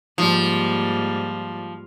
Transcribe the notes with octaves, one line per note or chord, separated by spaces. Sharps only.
G#2 F3 G3 A#3